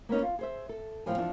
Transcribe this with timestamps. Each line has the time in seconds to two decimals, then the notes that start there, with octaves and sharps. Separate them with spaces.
0.09 A#3 B3 C#4 D#4
0.22 F4
0.39 G#4 C5 E5
0.69 A4
1.06 E2 A2 F3 G4 G#5
1.18 E2 F3 D4